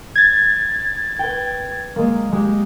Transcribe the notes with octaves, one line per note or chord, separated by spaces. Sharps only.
G#6 A6
B4 G5
G#3 A#3
G#3 G4